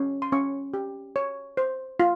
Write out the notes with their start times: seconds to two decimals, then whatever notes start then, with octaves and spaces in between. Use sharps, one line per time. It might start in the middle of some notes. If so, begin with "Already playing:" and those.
Already playing: C#4
0.22 C6
0.32 C#4 C#6
0.74 G4
1.16 C#5
1.57 C5
2.00 F4